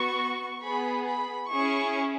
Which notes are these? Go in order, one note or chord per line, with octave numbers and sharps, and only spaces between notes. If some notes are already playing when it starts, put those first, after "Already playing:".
Already playing: B3 F#4 C#6
B3 G#4 B5
B5
C#4 E4 G#4 C#6